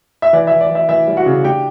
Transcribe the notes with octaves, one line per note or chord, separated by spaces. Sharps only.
E5
E3 D5
E3 E5
D5
E3 E5
E3 E5
G3
F#4 F#5
C#3
D4 G4 G5